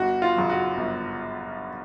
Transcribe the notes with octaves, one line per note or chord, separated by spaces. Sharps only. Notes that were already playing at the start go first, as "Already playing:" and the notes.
Already playing: G1 F#4
F4
F#2 C#3 F#3
F#4
G1